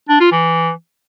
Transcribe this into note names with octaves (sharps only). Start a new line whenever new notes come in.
D4
F4
E3